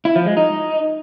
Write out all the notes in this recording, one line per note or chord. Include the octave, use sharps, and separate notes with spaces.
E4
F3
G#3
D#4